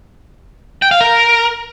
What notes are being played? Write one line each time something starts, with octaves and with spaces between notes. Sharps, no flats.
G5
F5
A#4